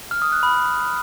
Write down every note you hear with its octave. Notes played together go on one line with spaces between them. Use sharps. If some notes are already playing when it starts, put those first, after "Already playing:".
F6
D#6
F#6
B5